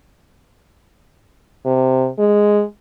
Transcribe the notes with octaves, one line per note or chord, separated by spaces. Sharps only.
C3
G#3